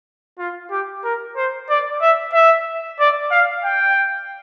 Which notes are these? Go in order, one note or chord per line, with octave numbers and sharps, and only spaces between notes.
F4
G4
A#4
C5
D5
E5
E5
D5
F5
G5